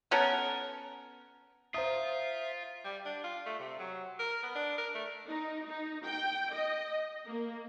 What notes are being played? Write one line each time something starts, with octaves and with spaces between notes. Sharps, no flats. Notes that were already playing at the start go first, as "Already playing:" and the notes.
B3 C#4 A4 A#4
F4 C5 E5 A#5 D#6
G3
D4
F4
A3
C3
F#3
A#4
B3
D4
A#4
A3
D#4
D#4
G5
D#5
A#3